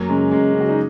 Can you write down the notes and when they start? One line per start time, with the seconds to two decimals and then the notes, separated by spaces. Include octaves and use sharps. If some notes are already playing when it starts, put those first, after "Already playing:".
Already playing: F#2 F#3 A#3
0.09 C#3 G#3 C#4
0.31 F#2 G#3 C#4
0.54 C#3
0.60 F#4
0.69 D#4